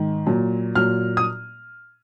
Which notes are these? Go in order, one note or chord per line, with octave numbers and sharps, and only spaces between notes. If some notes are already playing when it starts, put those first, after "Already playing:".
Already playing: G#2 D#3
A#2 F#3
A#2 F#3 F6
D#6